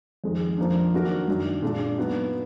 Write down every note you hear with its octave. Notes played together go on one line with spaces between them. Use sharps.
F2 D#3 G#3
F2 F3 A#3 D4
D#3 F#3 D4 F#4 A#4
F#2 D#3 F#3 D4
A#2 G#3 D4
F#3 B3 D#4 F#4